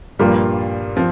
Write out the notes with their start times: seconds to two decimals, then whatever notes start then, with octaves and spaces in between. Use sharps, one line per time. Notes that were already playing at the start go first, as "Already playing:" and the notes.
0.19 G2 A#2 F3 G3 A#3 F4 A#4
0.96 F3 C4